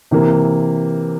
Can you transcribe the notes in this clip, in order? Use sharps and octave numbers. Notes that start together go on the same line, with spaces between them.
C3 E3 A#3